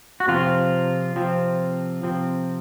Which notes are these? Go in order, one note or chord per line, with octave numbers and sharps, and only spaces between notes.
F#4
C3 F3 C4 F4
C3 F3 C4
C3 F3 C4